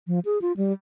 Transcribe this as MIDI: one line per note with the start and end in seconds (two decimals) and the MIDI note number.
0.07 0.20 53
0.25 0.39 68
0.42 0.52 65
0.57 0.72 55